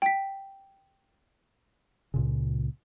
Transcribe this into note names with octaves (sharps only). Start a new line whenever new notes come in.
G5 B6
C#2 A#2 C#3